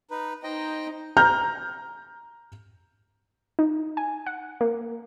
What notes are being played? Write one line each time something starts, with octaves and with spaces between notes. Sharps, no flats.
D#4 B4
D#4 C5 D#5 G5
A#5 F6 G6
D#4
G#5
F#5
A#3